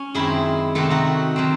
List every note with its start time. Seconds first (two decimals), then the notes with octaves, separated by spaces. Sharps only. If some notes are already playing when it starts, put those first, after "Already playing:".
Already playing: C#4
0.15 F#2 D#3 G#3 C4 E4 G#4
0.75 C3 D#3 A3 C4 F#4 A4
0.90 D#4 F#4
1.36 D#3 F#3 C4